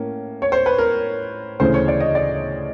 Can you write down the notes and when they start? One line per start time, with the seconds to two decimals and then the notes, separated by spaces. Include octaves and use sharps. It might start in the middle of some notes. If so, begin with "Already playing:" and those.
Already playing: A2 A#3 C#4
0.42 C#5
0.52 C5
0.66 B4
0.78 A#4
1.60 D2 C#3 E3 A3 C#4 C5
1.74 C#5
1.88 D5
2.00 D#5
2.15 D5